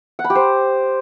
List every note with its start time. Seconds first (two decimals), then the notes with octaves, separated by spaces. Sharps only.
0.19 F#5
0.24 B5
0.30 G4
0.35 C5